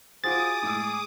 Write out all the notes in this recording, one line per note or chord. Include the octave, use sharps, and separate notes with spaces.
F4 F#4 G#4 C5 D6 D#6 A6
A2 G#3 E6